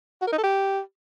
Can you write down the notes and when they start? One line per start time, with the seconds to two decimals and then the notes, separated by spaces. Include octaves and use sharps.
0.22 F#4
0.27 A#4
0.33 D#4
0.38 A4
0.44 G4